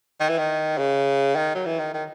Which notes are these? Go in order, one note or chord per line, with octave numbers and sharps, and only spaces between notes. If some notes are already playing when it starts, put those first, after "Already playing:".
D#3
E3
D#3
C#3
D#3
F#3
E3
D#3
D#3